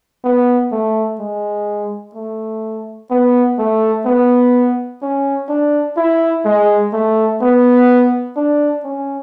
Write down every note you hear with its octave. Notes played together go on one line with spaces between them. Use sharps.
B3
A3
G#3
A3
B3
A3
B3
C#4
D4
E4
G#3
A3
B3
D4
C#4